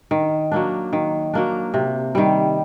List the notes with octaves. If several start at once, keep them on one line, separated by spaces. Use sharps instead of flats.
D#3
F#3 A#3 D4
D#3
F#3 A#3 D4
C3
D#3 G3